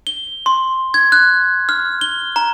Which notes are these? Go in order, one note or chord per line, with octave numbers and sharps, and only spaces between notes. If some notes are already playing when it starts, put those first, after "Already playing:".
G7
C6
G#6
F#6
F6
G7
A#5